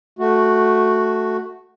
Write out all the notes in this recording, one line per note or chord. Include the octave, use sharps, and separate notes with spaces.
A3 F#4